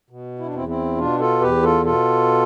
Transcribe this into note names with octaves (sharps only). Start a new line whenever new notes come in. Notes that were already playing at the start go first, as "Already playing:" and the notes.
B2
E4
D4
E2 C4 E4
C4 E4
B2 D4 F4
F4 A4
E2 G4 B4
F4 A4
B2 F4 A4